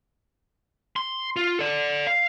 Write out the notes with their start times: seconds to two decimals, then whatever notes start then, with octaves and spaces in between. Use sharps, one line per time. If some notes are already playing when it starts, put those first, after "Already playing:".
0.96 C6
1.36 F4
1.59 A4 D5
2.07 F5